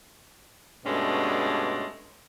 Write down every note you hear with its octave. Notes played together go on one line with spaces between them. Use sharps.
G2 B2 G#3 A3 C#4 D5